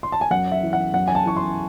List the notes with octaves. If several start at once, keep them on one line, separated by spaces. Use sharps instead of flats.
C6
A5
G#5
F#2 F#5
E5
E3
F#5
F#2 F#5
G#5
A5
E3 C#6
C6